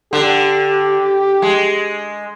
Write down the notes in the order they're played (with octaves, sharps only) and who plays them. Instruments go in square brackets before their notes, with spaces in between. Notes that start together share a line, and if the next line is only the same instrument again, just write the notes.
[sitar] D3 [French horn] G4
[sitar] G#3